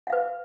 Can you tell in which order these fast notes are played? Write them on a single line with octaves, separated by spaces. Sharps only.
F#5 F5 B4